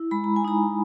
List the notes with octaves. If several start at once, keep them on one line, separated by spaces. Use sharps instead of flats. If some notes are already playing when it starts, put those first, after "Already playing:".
Already playing: E4
G#3 B5
A#5
G#5
D#4 A#5